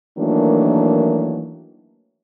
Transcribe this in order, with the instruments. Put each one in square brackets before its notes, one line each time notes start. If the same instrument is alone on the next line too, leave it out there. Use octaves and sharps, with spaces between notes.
[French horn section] D#3 E3 F#3 A3 A#3 D4